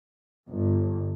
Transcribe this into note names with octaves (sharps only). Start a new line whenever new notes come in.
G1